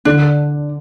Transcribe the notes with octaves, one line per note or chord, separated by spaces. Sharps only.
D3 D4